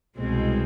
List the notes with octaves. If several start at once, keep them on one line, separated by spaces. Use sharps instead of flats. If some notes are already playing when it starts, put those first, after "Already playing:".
C2 B2 G#3 C4